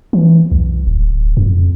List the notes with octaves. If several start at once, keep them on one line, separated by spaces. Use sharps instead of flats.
E3
B1
D1
F2